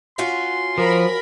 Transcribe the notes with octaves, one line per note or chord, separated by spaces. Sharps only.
C#4 F4 F#4 C6
F3 A#4 B5